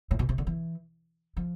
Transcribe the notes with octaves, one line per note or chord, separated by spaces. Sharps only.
A2
B2
C3
D3
E3
F3